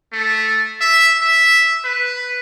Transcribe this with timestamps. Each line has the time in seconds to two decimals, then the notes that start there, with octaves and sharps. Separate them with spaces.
0.13 A3
0.81 E5
1.21 E5
1.84 B4